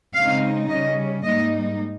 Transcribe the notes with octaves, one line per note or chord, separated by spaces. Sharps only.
C#3 G#3 C4 D#4 F5
C#3 G3 C#4 D#5
G#2 G3 A#3 D#4 D#5